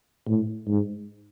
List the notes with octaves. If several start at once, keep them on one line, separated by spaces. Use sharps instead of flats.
A2
G#2